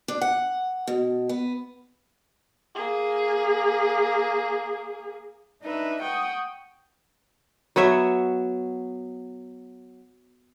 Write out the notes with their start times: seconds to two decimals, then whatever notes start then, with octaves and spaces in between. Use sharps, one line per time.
0.08 D4
0.21 F#5
0.87 B2
1.29 B3
2.75 A#3 G#4
5.61 D4 D#4 B4 E5
6.00 F#5 G5 C#6 D#6
7.76 F#3 B3 C#5 E5